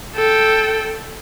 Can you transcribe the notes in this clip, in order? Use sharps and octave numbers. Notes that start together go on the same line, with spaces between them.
A4 G5